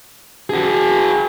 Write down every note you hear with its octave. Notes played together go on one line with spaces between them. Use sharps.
F#4 G#4